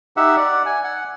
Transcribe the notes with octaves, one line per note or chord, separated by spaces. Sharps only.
D#4 G4 E5 F#5
D5 F#5
G#5
F#5